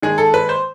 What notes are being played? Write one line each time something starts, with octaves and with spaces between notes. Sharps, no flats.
D#3 G#3 G#4
A4
B4
C5